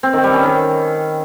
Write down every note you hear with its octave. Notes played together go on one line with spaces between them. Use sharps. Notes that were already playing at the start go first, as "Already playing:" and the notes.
C4
D#3
G3
C#4
D#3